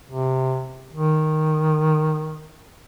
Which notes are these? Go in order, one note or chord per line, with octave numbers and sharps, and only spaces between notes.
C3
D#3